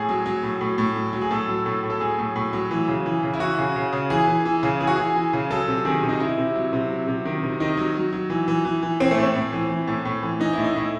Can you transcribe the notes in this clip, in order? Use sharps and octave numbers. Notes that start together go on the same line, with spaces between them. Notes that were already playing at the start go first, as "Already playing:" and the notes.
Already playing: A2 G#4
F#3
F#3
A2
A2
A2
F#3
F#3
G#4
A2 A4
F#3
A2
A2
A4
F#3 G#4
A2
A2
F#3
E3
C#3
E3
C#3
E4
E3 F#4
C#3
C#3
C#3
E3 G#4
E3
E3
C#3
E3 G#4
F#4
E3 G#4
E3
C#3
F#3 A4
C3
D#3 G#4
C3
D#4
C3 E4
C3
F#3
C3
F#3
C3
D#3
C3
D#3 D#4
F#3
F#3
F#3
E3
E3
E3
E3
E3 C4
A3
A2
C4
A2
E3
E3
A2
A2
E3
E3 D#4
A2 E4
D#4
A2 E4